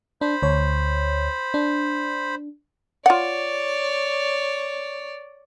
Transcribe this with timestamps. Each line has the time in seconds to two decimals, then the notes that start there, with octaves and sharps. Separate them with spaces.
0.21 D4 C5 B5
0.43 D2 C#5
1.54 D4
3.06 F4 C#5 D5 F#5